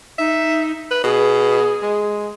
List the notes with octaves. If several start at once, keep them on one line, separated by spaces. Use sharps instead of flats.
D#4 E5
B4
B2 G#4
G#3